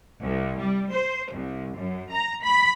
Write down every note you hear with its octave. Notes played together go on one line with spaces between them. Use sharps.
C2
G3
C5
C2
F#2
A#5
B5